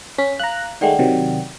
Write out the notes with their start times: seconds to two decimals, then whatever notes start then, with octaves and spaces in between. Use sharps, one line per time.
0.18 C#4 B6
0.39 F5 A#5 F#6
0.81 D#3 G#3 A3 D5 F#5 G5
0.99 C3 D#3 F#3